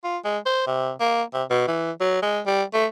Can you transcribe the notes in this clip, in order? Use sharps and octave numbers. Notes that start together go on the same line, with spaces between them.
F4
G#3
C5
C3
A#3
C3
B2
E3
F#3
G#3
G3
A3